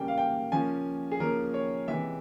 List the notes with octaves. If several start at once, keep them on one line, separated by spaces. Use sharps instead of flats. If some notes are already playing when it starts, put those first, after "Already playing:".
Already playing: C#3 G3 A#3 G5
F5
G5
C#3 F3 A#3 C#4 G#5
G#4
C#3 F3 A#3 C#4 A#4
C#5
C3 E3 G#3 E5